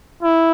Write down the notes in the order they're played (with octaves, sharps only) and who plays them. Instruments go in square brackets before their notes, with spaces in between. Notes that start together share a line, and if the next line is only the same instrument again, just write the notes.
[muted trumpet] E4